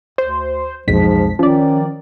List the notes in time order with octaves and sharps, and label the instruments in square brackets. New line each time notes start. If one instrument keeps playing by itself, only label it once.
[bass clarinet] D2 [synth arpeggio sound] C5
[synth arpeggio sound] B1 F2 B6 [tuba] G#2 [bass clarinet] F3
[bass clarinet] D#3 [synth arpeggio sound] F3 D5 [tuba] C#4